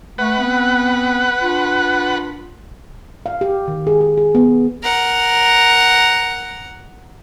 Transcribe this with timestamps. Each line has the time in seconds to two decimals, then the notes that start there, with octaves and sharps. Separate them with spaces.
0.18 A3 B4 F#5
0.38 B3 C4
1.42 D4 F4
3.26 F5
3.41 G4
3.68 D#3
3.87 G#4
4.01 G#4
4.17 G#4
4.35 B3
4.83 A#4 F#5